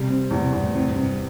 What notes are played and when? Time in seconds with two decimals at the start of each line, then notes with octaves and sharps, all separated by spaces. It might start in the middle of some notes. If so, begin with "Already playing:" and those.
Already playing: C3 G3
0.10 C4
0.31 E2 A2
0.43 C3
0.52 E2 G2
0.64 A2
0.75 A2 C3
0.89 G2
0.96 C3
1.03 G2